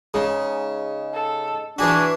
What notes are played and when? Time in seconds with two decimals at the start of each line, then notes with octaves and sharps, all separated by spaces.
0.14 C#3 G#3 D#4 G#4
1.13 A4
1.79 E3 D4 F#4 G#4 B5